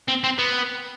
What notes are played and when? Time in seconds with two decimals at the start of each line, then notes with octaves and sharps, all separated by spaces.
0.08 C4
0.24 C4
0.39 B3